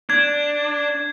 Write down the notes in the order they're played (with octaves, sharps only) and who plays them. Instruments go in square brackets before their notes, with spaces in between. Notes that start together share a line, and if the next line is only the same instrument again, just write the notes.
[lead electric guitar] D4 [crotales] G#6